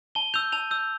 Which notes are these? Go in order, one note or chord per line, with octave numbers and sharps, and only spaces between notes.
A5 G7
E6 G6 F7
A5 F7
E6 G6